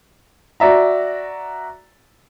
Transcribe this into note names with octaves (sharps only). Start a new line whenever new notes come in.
F#4 D5 E5 A#5